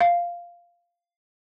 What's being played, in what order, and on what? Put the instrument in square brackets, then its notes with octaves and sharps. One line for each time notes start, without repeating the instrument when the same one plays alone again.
[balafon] F5